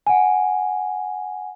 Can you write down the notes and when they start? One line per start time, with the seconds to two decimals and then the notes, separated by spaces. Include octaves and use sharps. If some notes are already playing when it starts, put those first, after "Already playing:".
0.07 F#5 G#5